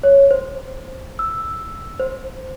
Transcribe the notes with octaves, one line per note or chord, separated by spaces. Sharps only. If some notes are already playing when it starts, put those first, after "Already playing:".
C#5
C5
E6
C5